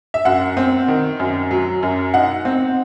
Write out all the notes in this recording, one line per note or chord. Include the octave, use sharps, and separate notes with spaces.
E5
F#2 F#5
C4
D#3
F#2
F#3
F#2
D#4 F#5
C4